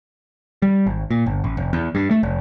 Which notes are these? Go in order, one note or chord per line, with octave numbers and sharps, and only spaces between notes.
G3
G#1
A#2
G1
A1
F1
E2
G2
A3
F1